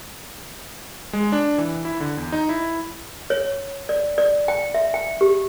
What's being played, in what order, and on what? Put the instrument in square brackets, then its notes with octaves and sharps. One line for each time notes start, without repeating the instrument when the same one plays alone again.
[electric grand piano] G#3
D4
E3
E4
D3
E2
D#4
E4
[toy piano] C#5
D5
D5
G5
E5
G5
G4